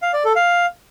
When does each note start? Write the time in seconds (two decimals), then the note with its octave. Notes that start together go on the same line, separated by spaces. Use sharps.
0.02 F5
0.14 D5
0.25 A4
0.36 F5